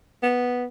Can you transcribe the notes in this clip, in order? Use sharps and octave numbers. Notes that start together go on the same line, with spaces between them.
B3